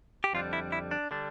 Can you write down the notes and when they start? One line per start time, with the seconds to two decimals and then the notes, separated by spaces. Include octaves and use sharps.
0.24 G4
0.33 F2 D3 G3 D4 F4
0.53 E4
0.72 E4
0.91 D4
1.11 D3 G3 D4